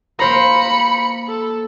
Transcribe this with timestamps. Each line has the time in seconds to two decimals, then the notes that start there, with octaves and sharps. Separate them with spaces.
0.19 A#3 C5 A#5 B5 C#7
1.29 A4